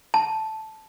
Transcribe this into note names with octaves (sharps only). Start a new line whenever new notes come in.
A5